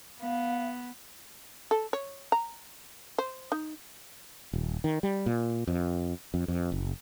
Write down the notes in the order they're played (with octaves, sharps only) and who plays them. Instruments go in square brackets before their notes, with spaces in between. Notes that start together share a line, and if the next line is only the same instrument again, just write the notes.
[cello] B3 [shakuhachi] F5
[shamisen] A4
C#5
A#5
C5
D#4
[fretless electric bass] D#1
D#3
G3
A#2
F2
F2
F2
F#1